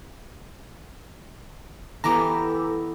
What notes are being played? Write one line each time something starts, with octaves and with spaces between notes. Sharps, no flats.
E3 B3 G4 A4 A#5 D6